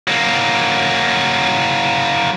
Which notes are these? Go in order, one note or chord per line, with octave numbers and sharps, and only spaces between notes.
F#3 A#3